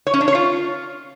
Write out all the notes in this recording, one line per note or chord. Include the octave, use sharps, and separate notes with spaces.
C#5
C#4
D4
C#5
F4